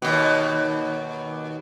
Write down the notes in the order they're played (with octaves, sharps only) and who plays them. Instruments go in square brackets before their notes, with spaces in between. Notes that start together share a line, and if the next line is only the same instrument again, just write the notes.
[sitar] D#2 B2